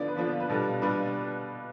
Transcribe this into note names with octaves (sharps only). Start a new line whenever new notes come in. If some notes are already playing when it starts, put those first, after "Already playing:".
Already playing: D3 F3 B3 D4 F4 D5
B4
D3 F3 B3 D4 F4
B4
B2 G3 D4 F4 A4
B2 G3 D4 F4 B4